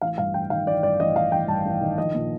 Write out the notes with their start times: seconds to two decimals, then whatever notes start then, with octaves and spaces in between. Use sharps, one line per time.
0.02 A1 F5
0.18 G2 F5
0.34 A1 G5
0.50 D#3 F5
0.67 A1 D5
0.83 G2 D5
1.00 A1 D#5
1.16 D#3 F5
1.32 A1 G5
1.48 G2 A5
1.66 A1
1.81 D#3
1.98 A#1 D#5
2.14 A#2